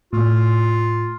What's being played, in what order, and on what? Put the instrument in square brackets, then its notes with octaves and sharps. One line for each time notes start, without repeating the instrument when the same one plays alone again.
[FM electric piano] A2 [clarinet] F4